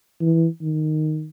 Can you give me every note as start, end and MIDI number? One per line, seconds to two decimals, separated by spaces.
0.21 0.47 52
0.62 1.28 51